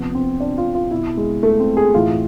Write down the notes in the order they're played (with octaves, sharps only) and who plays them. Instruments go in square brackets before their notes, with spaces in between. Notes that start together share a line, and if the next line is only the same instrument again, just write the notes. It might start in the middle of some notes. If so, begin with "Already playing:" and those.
Already playing: [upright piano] C3 F3 B3
C4
D4
F4
F4
B2 E4
G#3
A3
C4
G#4
A2 E3 F4